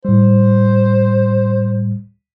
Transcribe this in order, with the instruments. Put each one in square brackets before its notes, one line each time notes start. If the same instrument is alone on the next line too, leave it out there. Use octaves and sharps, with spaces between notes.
[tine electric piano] A2 G3 [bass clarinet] C5